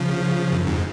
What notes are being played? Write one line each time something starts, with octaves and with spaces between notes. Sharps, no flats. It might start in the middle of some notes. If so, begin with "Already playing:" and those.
Already playing: C#3 F3
F#2
F2 G#2